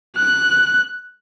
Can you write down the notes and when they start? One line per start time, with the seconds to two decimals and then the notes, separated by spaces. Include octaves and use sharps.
0.17 F#6